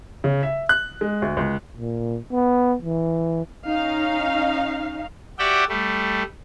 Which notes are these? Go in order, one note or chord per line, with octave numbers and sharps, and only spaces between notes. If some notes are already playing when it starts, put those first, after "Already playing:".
C#3
E5
F#6
G#3
D2
C#2
A#2
B3
E3
C#4 D#4 F5
F#4 G4 D5 E5 F#5 G5
G3 A3